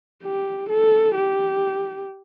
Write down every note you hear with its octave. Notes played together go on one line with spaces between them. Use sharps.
G4
A4
G4